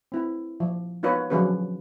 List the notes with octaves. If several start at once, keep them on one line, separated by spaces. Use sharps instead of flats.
C4 E4
F3
B3 D#4 F4 B4 C#5
D3 F3 F#3 C#4 G#4 B4